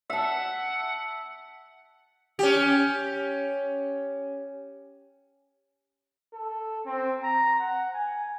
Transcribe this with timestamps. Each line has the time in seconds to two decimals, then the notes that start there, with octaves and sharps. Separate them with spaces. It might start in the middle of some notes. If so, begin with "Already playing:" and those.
0.10 E5 F#5 A5
2.39 C#4 G4
6.33 A4
6.86 C4
7.23 A#5
7.60 F#5
7.94 G#5